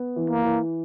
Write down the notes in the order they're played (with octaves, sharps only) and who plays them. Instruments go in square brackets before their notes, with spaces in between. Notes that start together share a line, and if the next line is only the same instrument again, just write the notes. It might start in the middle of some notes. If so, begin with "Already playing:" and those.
Already playing: [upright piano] B3
E3
[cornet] A#3
[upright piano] E3